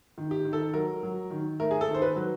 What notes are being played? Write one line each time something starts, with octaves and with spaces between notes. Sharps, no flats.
D#3
G4
D#3
A4
F#3 A#4
F#3
D#3
A3 A#4
G#4
A4
D#3
C5
B4
F#3